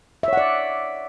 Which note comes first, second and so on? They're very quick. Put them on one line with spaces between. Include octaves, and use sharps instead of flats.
E5 C#5 F#5 D5